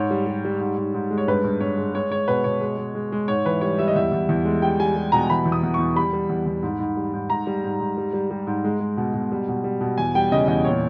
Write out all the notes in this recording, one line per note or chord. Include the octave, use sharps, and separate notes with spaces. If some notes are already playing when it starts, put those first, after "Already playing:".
Already playing: G#2 C#5
G3
G3
G3
G#2
G#2
G#2
G#3
C#5
G2 B4
G2
G2 C#5
G#3
G#3 C#5
G#3 C#5
B2 B4
B2 C#5
G#3
G#3
G#3
G#3
G#2 C#5
E3 B4
G3 C#5
G3 E5
D#5
E2 E5
E2
E2
G#3
G3 G5
G3 G#5
G3
B2 A#5
E3 B5
E2
D#6
E2
E2 C#6
G3 B5
G3
E2
E2
G#2
G#2
G3
G#2
G#2 A#5
G3
G#2
G#2
G3
G3
G3
G#2
G#3
G#3
B2
B2
G3
B2
G3
B2
E2 G#5
G3 G5
C#3 D#5
E2 D#5
A#2 C#5